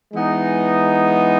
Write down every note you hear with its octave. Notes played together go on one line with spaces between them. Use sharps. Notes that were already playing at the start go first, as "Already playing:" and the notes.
E3 G#3 B3 D#4 G#4